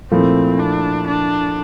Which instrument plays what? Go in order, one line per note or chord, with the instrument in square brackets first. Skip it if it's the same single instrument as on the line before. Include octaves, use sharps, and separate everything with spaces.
[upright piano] A#2 F3 A3 E4 [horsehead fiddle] C4
[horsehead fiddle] D4
D4